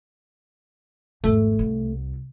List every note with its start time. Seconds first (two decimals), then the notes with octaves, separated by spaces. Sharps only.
1.24 G#1 E2 A3
1.59 C2